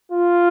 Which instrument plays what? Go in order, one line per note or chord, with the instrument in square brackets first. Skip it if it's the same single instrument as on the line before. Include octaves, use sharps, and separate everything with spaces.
[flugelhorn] F4